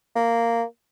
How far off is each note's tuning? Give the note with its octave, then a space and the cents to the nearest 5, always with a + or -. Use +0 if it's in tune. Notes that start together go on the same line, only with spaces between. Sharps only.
A#3 -10